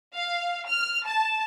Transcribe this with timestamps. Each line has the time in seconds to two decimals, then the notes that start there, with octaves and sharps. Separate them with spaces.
0.13 F5
0.67 F6
1.05 A5